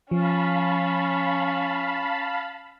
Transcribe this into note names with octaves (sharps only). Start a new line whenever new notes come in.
F3 C#4 F5 A5 B5